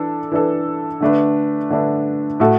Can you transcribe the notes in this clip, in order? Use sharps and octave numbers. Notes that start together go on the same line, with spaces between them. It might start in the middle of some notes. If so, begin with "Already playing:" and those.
Already playing: E3 D4 A4
E3 D4 A4
D3 A3 D4 B4
D3 A3 D4 B4
A2 A3 F#4 A4